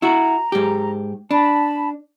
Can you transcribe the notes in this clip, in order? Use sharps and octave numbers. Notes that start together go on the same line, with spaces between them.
E4 F#4 A#5
G#2 G4
D4 A5 B5